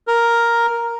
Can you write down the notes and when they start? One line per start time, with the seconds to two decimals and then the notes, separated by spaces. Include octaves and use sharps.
0.08 A#4